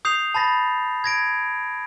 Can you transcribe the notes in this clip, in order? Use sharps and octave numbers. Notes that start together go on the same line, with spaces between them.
D#6 G6 C7 F7
A5 B5 A6 A#6
G#6 A#6 D7